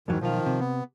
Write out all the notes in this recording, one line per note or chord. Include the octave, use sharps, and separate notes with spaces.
F2 G#2 D#3 E3 F#3
B1 D#3 F3 F4
C3
B3